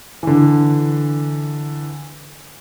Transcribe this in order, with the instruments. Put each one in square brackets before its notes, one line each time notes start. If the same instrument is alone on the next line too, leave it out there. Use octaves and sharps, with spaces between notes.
[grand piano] D3 E3